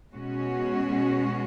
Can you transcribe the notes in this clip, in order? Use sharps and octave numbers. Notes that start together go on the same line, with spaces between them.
B2 G#3 C#4 F#4